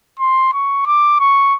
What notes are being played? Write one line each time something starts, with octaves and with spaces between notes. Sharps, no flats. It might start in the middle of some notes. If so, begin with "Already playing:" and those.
C6
C#6
D6
C#6